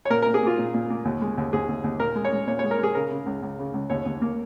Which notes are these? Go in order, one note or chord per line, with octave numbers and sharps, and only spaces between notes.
C#5
A#2 A#4
A#2 A#4
G#4
A#3 F4
A#2
A#2
A#3
D#2
G#3
D#2
D#2 G#4
D#2
D#2
A#2 A#4
G#3
C#5
G#3
A#2 C#5
G#3 C#5
A#4
G#3 G#4
C#3 A#4
C#3
C#2
C#2
C#3
C#2
D#2 C#5
D#2
A#3